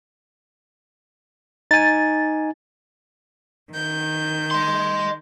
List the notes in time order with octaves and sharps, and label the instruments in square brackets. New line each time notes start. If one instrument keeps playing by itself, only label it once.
[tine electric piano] D#4 G#5 [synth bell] A6
[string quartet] D#3 G6
[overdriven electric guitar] D#5 C6